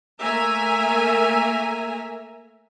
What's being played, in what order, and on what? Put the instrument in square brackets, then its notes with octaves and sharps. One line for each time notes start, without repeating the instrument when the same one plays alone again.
[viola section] A3 A#3 A#4 E5 G#5 A#5